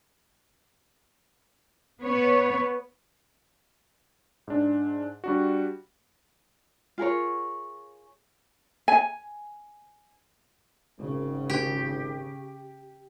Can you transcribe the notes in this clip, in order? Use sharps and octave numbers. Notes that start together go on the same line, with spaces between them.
B3 C#5
G#2 D4
G3 D4 F#4
F4 G#4 A#4 C#5
G#5
G#1 C#3
G4